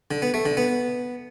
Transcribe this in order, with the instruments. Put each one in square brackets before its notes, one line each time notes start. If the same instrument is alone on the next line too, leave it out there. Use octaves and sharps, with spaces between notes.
[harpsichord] D3
B3
A3
D3
B3